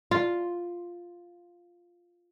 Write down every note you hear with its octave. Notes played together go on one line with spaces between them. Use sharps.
F4